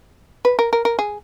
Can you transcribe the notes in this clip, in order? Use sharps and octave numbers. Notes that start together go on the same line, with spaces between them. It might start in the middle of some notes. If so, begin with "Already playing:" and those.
B4
A#4
A#4
A#4
G#4